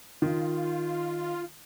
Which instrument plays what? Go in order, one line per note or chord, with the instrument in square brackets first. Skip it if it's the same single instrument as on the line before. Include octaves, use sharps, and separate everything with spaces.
[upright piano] D#3 [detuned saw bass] F4